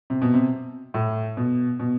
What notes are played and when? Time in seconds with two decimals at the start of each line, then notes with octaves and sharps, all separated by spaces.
0.10 C3
0.22 B2
0.34 C3
0.94 A2
1.37 B2
1.80 B2